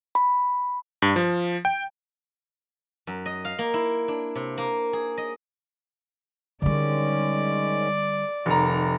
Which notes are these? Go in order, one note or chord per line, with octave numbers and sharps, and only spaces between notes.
B5
G2
F3
G5
F#2
D#5
F5
A#3
E4
D4
C3
A#3
G#4
D#5
D3 D#3 G3 G#3 C#4 D5
F1 D#3 F#5 A#5